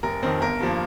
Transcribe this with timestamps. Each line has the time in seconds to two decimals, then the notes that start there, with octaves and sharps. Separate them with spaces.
0.03 F1 A#4
0.23 F2 D#3 C4
0.41 G1 A#4
0.60 G2 F3 A#3